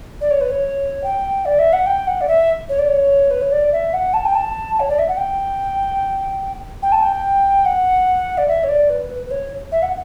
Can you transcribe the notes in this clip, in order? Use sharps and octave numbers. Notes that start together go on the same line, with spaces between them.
D5
C#5
B4
C#5
G5
D5
E5
F#5
G5
F#5
D5
E5
C#5
D5
C#5
B4
C#5
D5
E5
F#5
A5
G5
A5
C#5
D5
E5
F#5
G5
G5
A5
G5
F#5
D5
E5
C#5
D5
B4
B4
B4
C#5
E5
F#5